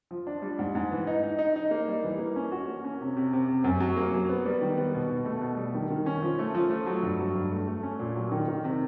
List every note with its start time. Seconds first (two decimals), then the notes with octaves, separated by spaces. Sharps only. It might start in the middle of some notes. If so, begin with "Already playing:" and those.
0.11 F3
0.27 D4
0.42 G3
0.59 G#2
0.75 G#2
0.91 E3
1.07 D#4
1.23 D#4
1.39 D#4
1.56 D#4
1.71 A#3
1.88 G3
2.04 E3
2.19 A#3
2.36 C#4
2.52 F#4
2.68 A#3
2.84 C#4
3.01 C3
3.17 C3
3.33 C3
3.48 C3
3.64 F#2
3.80 F#3
3.97 A#3
4.14 F#3
4.29 B3
4.46 G3
4.61 D#3
4.77 B3
4.94 B2
5.10 B2
5.26 A3
5.41 B2
5.57 G3
5.75 D#3
5.90 D#3
6.06 C#4
6.22 F3
6.39 A3
6.55 F3
6.70 A3
6.87 F#3
7.03 G2
7.19 F#3
7.35 G2
7.51 A3
7.67 A3
7.83 C#4
7.99 A#2
8.16 F#3
8.32 D#3
8.48 D#3
8.64 C3